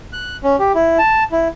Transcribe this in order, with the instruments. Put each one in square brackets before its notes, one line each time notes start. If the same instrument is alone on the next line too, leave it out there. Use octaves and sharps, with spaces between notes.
[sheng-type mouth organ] F#6
C#4
G4
E4
A5
E4